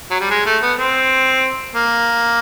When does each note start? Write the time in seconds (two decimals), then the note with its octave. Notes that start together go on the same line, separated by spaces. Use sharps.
0.10 F#3
0.20 G3
0.30 G#3
0.46 A3
0.62 B3
0.78 C4
1.75 A#3